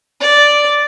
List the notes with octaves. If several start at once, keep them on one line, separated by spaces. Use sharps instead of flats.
D5